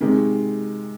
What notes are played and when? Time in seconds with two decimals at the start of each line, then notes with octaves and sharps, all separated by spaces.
0.01 C3 D#3 G#3